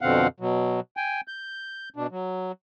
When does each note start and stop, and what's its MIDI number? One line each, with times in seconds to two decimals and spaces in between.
0.01 0.27 41
0.01 0.27 47
0.01 0.27 50
0.01 0.27 60
0.01 0.27 77
0.01 0.27 78
0.40 0.80 47
0.40 0.80 54
0.97 1.21 79
0.97 1.21 80
1.28 1.89 91
1.96 2.07 47
1.96 2.07 62
2.11 2.52 54